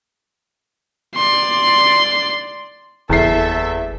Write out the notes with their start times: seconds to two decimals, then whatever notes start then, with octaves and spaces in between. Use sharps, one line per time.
1.16 D5 C6
3.10 F#1 E2 A4 E5 C7